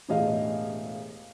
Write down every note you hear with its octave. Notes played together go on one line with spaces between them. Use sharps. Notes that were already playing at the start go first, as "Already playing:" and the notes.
E1 A2 G4 G#4 D#5 F5